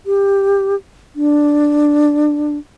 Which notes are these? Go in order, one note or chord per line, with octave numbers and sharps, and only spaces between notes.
G4
D4